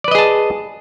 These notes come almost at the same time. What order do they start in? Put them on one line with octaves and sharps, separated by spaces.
D5 B4 D#5 G#4 A5